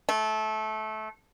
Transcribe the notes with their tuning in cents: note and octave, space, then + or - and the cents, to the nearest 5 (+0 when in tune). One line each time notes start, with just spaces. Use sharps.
A3 -20